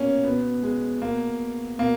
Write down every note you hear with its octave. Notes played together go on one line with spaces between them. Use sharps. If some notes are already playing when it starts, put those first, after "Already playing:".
Already playing: B2 A#3 C#4
B2 B3
G#3
B2 A#3
B2 A#3